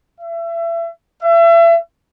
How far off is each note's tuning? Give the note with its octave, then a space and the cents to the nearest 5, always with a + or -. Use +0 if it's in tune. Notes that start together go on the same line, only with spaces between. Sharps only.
E5 +30
E5 +35